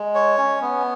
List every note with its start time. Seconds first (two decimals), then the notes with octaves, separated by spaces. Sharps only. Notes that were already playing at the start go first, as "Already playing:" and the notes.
Already playing: G#3
0.15 C#5
0.38 C#4
0.61 B3